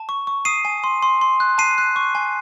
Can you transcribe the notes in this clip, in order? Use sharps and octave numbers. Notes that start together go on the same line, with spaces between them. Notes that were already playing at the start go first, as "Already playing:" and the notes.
Already playing: A5
C#6
C#6
D#6 C7 D#7
G#5
C6
C6
C6
F#6
A5 C7 D#7
F#6
C#6
G#5